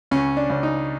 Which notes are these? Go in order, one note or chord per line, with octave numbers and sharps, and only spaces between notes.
C#2 C#4
D4
C#2
D#4